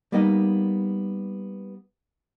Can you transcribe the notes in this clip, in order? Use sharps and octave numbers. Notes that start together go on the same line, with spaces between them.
G3 A#3 B3 D#4 D#5